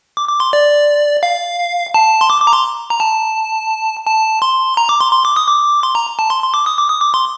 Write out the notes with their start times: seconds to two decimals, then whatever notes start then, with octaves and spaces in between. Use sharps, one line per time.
0.17 D6
0.29 D6
0.40 C6
0.53 D5
1.23 F5
1.94 A5
2.21 C6
2.30 D6
2.42 D6
2.47 A#5
2.53 C6
2.90 A#5
3.00 A5
4.07 A5
4.42 C6
4.77 A#5
4.89 D6
5.01 C6
5.13 C6
5.25 D6
5.36 D#6
5.48 D6
5.83 C6
5.95 A#5
6.19 A5
6.30 C6
6.43 C6
6.54 D6
6.66 D#6
6.78 D6
6.89 D#6
7.01 D6
7.14 C6